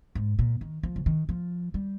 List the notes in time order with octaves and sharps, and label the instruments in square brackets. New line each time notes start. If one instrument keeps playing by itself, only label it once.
[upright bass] G#2
A#2
D#3
F3
C#3
D#3
F3
G3